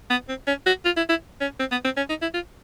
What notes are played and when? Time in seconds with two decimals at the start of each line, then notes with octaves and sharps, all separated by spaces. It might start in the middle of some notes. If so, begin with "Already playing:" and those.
0.10 B3
0.29 C4
0.47 C#4
0.66 F#4
0.85 F4
0.97 E4
1.09 E4
1.41 C#4
1.59 C4
1.72 B3
1.85 C4
1.97 C#4
2.09 D#4
2.22 E4
2.34 F4